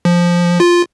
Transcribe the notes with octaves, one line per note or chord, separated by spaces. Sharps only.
F3
F4